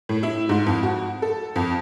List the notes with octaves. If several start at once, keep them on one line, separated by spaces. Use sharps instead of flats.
A2
E4
G#2
F2
F#4
A4
F2